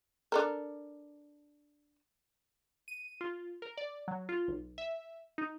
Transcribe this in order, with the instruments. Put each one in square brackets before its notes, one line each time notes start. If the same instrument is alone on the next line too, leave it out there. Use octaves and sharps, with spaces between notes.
[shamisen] D4 A4 A#4
[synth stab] D#7
F4
A#4
D5
F#3
F4
B1
E5
D#4